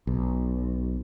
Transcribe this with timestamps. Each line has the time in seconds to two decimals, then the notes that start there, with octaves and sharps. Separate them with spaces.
0.07 B1